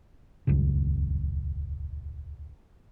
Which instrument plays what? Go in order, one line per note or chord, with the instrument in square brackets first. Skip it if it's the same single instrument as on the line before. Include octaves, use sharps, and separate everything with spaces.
[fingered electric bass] D#1 C#2 F#2 C#3